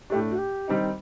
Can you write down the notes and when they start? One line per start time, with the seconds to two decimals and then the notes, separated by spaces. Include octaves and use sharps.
0.10 A2 A3 D4 G4
0.31 F#4
0.38 G4
0.68 D#3 G3 C4 D#4